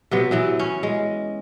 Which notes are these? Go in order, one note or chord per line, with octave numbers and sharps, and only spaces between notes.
C3 F#3 B3
E3 F#3 B3
C#4
G#3